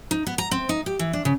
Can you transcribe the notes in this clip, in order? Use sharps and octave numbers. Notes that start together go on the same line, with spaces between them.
D#4
B3
A#5
C4
D#4
G4
E3
D4
C#3